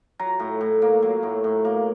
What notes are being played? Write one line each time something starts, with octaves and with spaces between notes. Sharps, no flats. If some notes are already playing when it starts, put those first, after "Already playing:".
F#3 A#5
A2
A2
A#3
F#3
A2
A2
A#3